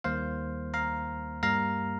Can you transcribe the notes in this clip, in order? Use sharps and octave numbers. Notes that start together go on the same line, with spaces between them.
D#2 D#3 G3 A#3 C5 F5
F5 A#5
G2 G3 A#3 F5 A#5